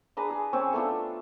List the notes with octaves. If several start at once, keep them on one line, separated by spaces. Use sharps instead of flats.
D4 G#4 B4 A#5
G#4
C4 C#4 C#5
A3 B3 D4 F4